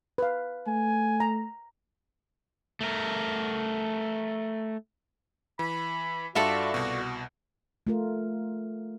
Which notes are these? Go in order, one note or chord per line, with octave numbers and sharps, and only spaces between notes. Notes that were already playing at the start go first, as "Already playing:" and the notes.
B4 F5
A3 G#5
A#5
A3 A#4
E3 B5
G2 F4 F#4 A4 D5 E5
C2 B2
A3 F4 A#4